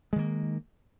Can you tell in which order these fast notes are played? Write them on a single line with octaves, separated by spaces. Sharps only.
G#3 D#3 A#3